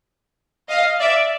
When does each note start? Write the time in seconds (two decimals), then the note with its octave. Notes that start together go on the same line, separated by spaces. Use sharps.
0.69 D#5 F5
1.00 D5 E5